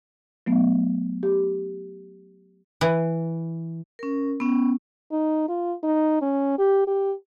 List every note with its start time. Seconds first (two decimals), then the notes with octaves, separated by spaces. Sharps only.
0.46 F#3 A3 B3
1.23 G4
2.81 E3
3.99 C#4 A#4
4.40 B3 C#4
5.12 D#4
5.49 F4
5.84 D#4
6.22 C#4
6.59 G4
6.88 G4